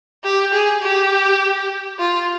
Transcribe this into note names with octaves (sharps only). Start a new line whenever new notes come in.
G4
G#4
G4
F4